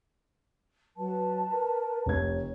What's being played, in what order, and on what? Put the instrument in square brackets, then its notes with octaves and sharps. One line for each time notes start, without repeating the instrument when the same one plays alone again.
[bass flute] F#3 [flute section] B4 A5
[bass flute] A#4
[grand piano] F1 G#6 [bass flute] C#5